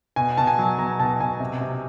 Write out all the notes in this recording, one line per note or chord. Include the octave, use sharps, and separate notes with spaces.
B2 G#5
B2 A5
G#5
F#3
B2 A#5
B2 A5
B2 G#5
C3
C3